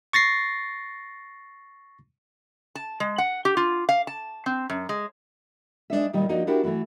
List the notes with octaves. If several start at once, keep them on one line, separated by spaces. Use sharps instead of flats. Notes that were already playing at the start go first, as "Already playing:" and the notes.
C#6 A6 A#6 C7
A5
G#3
F#5
G4
F4
F5
A5
C4
F#2
G#3
G#3 D4 D#4 E5
A#2 D#3 G3 D#4
F3 A#3 D4 D#4 F#4
D4 E4 F#4 G4 A#4
E3 A3 E4 F#4